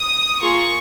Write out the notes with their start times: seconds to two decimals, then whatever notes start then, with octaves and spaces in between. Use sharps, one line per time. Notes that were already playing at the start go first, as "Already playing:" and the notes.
Already playing: D#6
0.41 A#3 F4 G#4 C#6